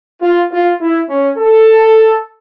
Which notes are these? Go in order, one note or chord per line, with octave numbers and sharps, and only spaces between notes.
F4
F4
E4
C#4
A4